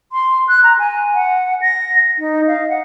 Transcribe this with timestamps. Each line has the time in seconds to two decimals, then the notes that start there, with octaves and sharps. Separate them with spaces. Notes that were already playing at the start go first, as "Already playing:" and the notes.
0.12 C6
0.48 F#6
0.64 A#5
0.79 G#5
1.14 F#5
1.62 A#6
2.19 D#4
2.47 F5
2.69 F#5